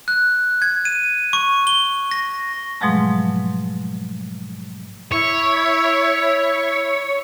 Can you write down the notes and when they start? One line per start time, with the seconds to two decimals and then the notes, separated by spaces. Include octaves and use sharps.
0.08 F#6
0.62 G#6
0.85 D#7
1.33 C#6
1.67 G7
2.11 A#6
2.81 G#2 B2 F3 F#3 G#3 A3
5.12 E4 C#5